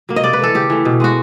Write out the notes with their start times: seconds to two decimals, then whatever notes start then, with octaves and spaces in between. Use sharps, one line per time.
0.09 F#3 A#3
0.16 D#5
0.24 C3 D5
0.33 B4
0.39 E3 A3 A4
0.55 C#3 G4
0.70 E3 A3
0.85 B2
1.00 G#3 B3 F#4